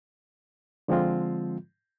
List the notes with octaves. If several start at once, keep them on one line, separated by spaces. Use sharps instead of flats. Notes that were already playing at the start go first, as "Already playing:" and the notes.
D3 F3 G#3 C4 F4